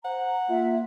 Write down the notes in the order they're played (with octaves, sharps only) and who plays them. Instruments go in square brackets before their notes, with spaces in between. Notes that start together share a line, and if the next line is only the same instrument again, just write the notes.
[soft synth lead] C5 [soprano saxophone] F#5 [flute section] A#5
[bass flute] A#3 [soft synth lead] F4 [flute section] E5